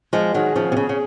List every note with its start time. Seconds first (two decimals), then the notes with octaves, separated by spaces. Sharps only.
0.13 F3 G#3
0.34 D#3 F#3 G#4
0.55 C#3 F3
0.72 C3
0.77 C#3
0.89 C#3